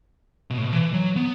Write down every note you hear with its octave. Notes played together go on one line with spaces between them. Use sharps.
B2
A2
B2
E3
F#3
B3